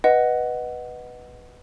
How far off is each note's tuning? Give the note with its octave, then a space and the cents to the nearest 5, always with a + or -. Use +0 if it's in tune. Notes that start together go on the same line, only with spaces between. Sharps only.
B4 -5 D#5 +0 F#5 +0